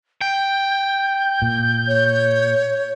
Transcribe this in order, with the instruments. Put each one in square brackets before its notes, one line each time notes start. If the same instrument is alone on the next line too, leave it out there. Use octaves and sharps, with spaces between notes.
[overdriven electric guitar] G5 [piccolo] G6
[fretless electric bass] A#2
[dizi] C#5